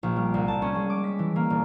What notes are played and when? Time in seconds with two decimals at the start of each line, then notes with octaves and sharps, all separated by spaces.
0.03 A#1
0.16 G3
0.34 C2
0.48 A5
0.62 C#4
0.75 G#3
0.90 D6
1.04 B6
1.19 E3
1.36 A#3
1.50 E1